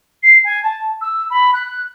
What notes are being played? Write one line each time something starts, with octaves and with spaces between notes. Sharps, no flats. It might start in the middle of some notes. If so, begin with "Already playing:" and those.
C7
G#5
A5
E6
B5
F#6